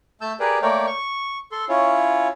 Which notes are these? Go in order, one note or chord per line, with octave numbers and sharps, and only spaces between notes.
A3 A5 E6 G6
G4 G#4 A#4 B4 D5
A3 A#3 A#4 C#5 D5 G5
C#6
A4 C6
C#4 E4 F4 C#5